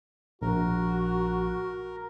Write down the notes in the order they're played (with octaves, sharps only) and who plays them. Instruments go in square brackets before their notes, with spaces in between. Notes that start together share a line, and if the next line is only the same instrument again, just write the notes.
[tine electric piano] A#1 [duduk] F#4 [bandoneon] A#4